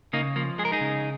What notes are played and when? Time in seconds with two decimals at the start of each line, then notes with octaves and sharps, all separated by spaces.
0.13 C#3 A#3 D#4
0.36 F3 A#3
0.58 G#3 G#4
0.65 A#4
0.72 D#4 G#4
0.81 C#3